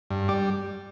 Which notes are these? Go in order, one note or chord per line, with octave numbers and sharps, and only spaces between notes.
G2
G3 D5